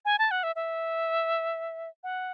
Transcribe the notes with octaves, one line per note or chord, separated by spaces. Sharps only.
G#5
A5
F#5
E5
E5
F#5